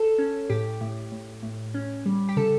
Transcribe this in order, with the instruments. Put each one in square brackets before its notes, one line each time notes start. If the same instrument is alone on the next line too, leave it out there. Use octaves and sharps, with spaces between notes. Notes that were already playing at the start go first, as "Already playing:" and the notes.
Already playing: [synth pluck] A4
C#4
A2 G4
A2
A2
A2
C#4
G3
G4
C#3 A4